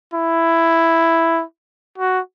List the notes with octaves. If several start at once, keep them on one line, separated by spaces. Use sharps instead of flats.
E4
F#4